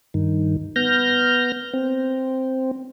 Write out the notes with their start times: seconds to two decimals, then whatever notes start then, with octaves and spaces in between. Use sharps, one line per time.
0.14 G2 D#3
0.76 B3 F6 G6 A#6
1.73 C4